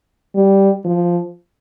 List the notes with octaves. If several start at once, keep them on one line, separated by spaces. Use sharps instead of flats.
G3
F3